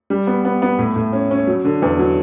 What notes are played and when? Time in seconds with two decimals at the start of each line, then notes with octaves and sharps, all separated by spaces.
0.10 G3
0.27 B3
0.45 B3
0.62 B3
0.79 A2
0.96 A2
1.13 C#4
1.31 C#4
1.47 F#3
1.65 D3
1.82 E2
1.99 F#3